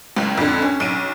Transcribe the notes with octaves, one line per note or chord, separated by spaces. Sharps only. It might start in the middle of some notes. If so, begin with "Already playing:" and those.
F#1 C#2
F2 D3
C#4
B1 D7 D#7